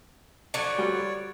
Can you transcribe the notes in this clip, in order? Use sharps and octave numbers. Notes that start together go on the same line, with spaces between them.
D3 F3 F#3 C#5 D5
G3 F#4